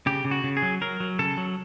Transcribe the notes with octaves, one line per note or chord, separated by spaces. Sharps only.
C#3 G4
C#3
F#4
C#3
G#4
F#3
F#3 A#4
F#3
C#3 A4
F#3